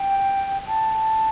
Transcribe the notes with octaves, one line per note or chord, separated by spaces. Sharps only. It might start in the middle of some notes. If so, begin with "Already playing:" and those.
Already playing: G5
A5